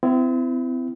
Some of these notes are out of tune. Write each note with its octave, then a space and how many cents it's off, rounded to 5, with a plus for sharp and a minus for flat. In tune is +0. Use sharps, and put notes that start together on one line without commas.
C4 -35 E4 +25